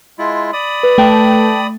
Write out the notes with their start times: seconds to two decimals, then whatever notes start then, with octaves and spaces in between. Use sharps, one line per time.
0.18 G#3 E4 F4
0.53 D5 B5 D#6
0.83 B4
0.98 A3 G5 A5